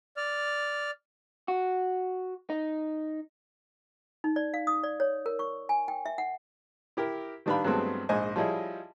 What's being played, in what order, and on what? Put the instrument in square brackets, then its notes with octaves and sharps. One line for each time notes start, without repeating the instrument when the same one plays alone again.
[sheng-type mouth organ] D5 F6
[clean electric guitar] F#4
D#4
[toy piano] D#4
D5
F5
D#6
D5
C#5
A#4
C#6
G#5
G5
E5
F#5
[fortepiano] E4 G4 A#4
D#3 G3 D4 B4 F5 B5
G2 F#3 G#3 A3 B3 C4
A#1 G#2 C5 D#5 G#5
F3 G3 E4 G#4 C#5 D#5